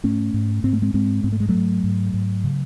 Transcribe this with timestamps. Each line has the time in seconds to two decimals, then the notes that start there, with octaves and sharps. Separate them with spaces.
0.04 G#2 A3 C#4
0.34 G#2
0.64 G#2 C4
0.73 A3
0.82 G#3 C4
0.94 G#2 G#3 C4
1.24 G#2 C4
1.32 A3
1.40 G#3
1.49 F#3 A3
1.55 G#2
1.84 G#2
2.14 G#2
2.44 C#3